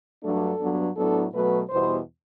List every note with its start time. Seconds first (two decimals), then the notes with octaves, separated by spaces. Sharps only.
0.23 G2 F#3 A3 D4 A4
0.60 G2 F#3 B3 D4
0.96 A2 F#3 B3 D4 A4
1.33 B2 F#3 A3 B4
1.69 E2 B2 G3 C5